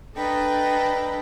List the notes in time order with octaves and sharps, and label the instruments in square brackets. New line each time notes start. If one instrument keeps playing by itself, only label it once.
[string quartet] D4 A4 B4 D#5 G5 A#5